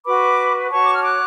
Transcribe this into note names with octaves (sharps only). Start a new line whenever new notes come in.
F#4 B4 B5 D6
F#4 C#5 A5 C#6
D6
F6
D6 F#6